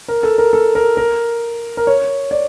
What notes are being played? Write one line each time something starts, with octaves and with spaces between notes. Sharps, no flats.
A#4
A4
A#4
A4
A#4
A#4
A#4
C#5
D5